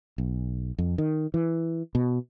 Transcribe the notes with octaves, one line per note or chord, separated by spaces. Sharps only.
B1
F2
D#3
E3
B2